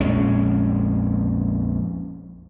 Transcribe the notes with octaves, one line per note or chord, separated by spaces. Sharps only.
A#1 F2 G#3 C#4